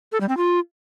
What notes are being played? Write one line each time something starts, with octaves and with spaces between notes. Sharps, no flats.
A4
G3
C4
F4